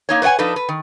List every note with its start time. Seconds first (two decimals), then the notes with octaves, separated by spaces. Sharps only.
0.09 A#3 D#4 C#5
0.22 B4 C#5 D#5 F#5 G#5
0.39 F3 D4 D#4 A4 B4
0.56 B4
0.69 D#3